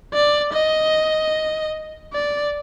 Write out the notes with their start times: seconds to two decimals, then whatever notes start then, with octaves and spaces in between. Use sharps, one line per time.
0.14 D5
0.53 D#5
2.13 D5